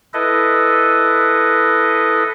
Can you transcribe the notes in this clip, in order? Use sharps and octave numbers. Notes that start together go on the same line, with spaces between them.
E4 A4 B4 D#5